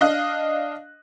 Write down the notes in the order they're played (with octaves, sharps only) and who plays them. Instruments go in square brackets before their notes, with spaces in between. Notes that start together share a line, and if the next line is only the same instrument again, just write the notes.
[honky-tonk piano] D4 D#5 F5 F#6